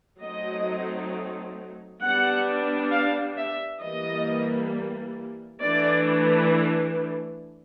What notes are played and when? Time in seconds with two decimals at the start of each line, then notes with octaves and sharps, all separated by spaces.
0.21 F#3 A3 C4 D#4 D#5
2.01 G3 B3 D4 F#5
2.91 F5
3.37 E5
3.81 E3 G3 A#3 D#5
5.62 E3 A3 D4 D5